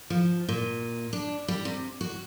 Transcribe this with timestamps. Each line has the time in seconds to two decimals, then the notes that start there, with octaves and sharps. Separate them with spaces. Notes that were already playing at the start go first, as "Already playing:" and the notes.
0.10 F3
0.49 A#2
1.13 D4
1.48 G3
1.65 C3
2.01 F#4